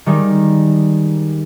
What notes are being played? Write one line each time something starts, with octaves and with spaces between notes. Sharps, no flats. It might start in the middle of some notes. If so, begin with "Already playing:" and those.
D#3 G3 G#3 D#4